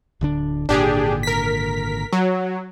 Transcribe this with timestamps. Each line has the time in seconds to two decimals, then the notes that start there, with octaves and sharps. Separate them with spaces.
0.21 D1 D3 D4
0.69 G#1 A#2 D3 D4 G4 G#4
1.23 A#4 B6
2.13 F#3